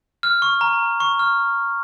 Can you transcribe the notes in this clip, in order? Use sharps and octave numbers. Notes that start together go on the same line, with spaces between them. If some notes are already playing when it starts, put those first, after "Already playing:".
F6
C#6
A#5
C#6
F6